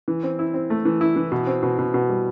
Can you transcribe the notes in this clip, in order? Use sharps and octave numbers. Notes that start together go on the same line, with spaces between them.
E3
C4
E4
C4
A3
E3
E4
E3
B2
C4
B2
B2
B2
G3